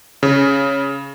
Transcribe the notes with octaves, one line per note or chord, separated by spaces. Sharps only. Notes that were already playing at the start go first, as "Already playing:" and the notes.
C#3